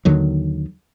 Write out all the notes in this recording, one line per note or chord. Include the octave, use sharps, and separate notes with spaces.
D#2 D3 D#3 F#3